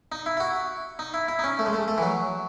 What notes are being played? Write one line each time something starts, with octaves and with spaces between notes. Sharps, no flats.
D#4
E4
E4
F#4
D#4
E4
E4
D#4
C#4
A3
G#3
A3
A3
E3
F#3